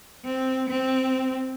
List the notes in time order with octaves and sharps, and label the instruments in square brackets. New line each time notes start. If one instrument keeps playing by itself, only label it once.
[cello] C4
C4